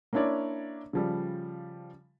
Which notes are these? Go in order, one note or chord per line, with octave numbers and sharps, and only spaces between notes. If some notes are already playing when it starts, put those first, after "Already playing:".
A#3 C#4 D4 E4 C#5 D5
C#3 F3 G3